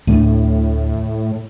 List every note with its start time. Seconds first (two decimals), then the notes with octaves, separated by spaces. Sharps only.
0.07 D2 A2 A3 D4